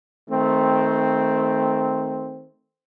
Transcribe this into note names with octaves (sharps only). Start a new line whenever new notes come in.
D#3 A3 C4